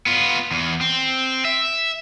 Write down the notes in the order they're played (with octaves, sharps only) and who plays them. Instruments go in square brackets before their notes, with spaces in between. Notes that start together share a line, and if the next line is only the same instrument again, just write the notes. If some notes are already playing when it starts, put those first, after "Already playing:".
[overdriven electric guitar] B3 F4
E2
C4
E5